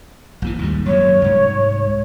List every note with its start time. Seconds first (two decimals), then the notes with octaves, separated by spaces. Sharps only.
0.42 A#1 A#2 E3
0.59 D#2 G#2 G3
0.86 F#2 A#2 C#5
1.22 C2 G#2